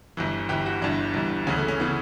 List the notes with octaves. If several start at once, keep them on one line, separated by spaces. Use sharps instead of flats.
G1 G2 E3
G1 G2 E3 G4
F#4
G1 G2 E3 D4
G1 G2 E3
D2 C#3 E3 C#4
A3
C#4
C#3 E3 B3